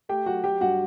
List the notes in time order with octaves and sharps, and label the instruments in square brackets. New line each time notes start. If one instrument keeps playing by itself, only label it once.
[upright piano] A3 G4 G5
F#3 F#4 F#5
F#3 G4 G5
G2 F#4 F#5